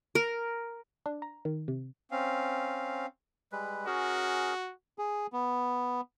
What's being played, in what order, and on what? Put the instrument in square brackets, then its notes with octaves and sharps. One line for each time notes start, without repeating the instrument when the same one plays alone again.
[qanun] A#4
[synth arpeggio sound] D4
A#5
D#3
C3
[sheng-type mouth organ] C4 C#4 F5
[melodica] G3 G#3 B4
[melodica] C#4 G#4 A#4 [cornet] F#4
[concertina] G#4
B3